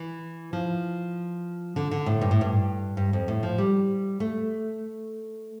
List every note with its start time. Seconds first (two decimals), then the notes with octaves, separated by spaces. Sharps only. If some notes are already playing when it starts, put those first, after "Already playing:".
Already playing: E3
0.53 F3
1.76 D3
1.91 D3
2.06 A2
2.21 G2
2.31 A2
2.41 G2
2.97 G2
3.13 F2
3.28 A2
3.43 F3
3.58 G3
4.20 A3